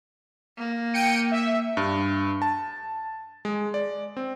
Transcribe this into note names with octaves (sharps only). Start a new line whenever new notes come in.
A#3
G5 C#7 D#7
E5
G2
A5
G#3
D5
C4